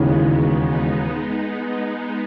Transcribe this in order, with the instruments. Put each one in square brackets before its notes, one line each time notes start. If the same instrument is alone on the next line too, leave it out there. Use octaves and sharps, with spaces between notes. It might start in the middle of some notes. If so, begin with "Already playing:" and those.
Already playing: [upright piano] E1 D#2 C#3 E3 [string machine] G#3 B3
[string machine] B3 D#4